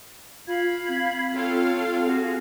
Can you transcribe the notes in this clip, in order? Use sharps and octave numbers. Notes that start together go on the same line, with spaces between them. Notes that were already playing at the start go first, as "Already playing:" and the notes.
F4 F5 B5 G#6
C4
F4 A4 C#5 F5 G5
C4
C4 F#4 G#4